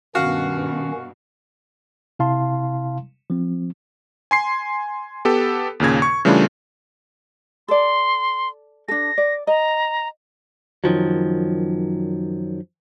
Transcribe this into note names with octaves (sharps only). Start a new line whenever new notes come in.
G2 B2 D#3 C#4 F#4 F5 F#5
C3 E4 F5 A5 C6
F3 C4
G#5 C6 C7
B3 G4 A4
D#2 A#2 C#3 G#6
C#6
C#3 E3 G3 A3 D4 F4
A4 D5 C6
D4 A4 A#6
D5
D#5 A#5
F#2 D#3 F3 F#3